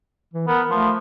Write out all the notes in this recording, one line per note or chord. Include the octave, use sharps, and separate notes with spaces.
E3
B3 A#4
F3 A3